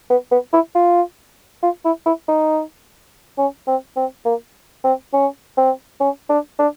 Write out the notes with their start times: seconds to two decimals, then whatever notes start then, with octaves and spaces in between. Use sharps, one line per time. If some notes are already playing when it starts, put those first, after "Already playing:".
0.10 B3
0.31 B3
0.53 E4
0.75 F4
1.63 F4
1.85 E4
2.06 E4
2.28 D#4
3.38 C#4
3.67 C4
3.96 C4
4.25 A#3
4.84 C4
5.13 C#4
5.57 C4
6.01 C#4
6.30 D4
6.59 D4